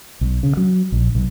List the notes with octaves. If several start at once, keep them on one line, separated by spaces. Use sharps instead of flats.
B1
C#3
F#3
A#1
B1